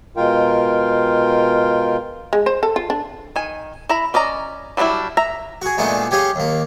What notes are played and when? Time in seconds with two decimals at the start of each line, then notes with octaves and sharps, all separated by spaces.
0.17 B2 G#3 F4 A#4 F5 G5
2.33 G#3
2.46 C5
2.63 A4
2.76 F4
2.90 D4
3.36 D#3 G#5
3.89 E4 A#5 B5
4.14 C#4 D5 D#5 A#5
4.77 F#3 G3 B3 D4 E4
5.17 E5 A#5
5.62 F#4 G#4
5.78 A#2 G#3 A3 B3 D4 D#4
6.11 G4 G#4 C#5 D#5 F5
6.36 D#2 A#3